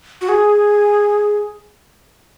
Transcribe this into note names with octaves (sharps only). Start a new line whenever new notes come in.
F#4
G#4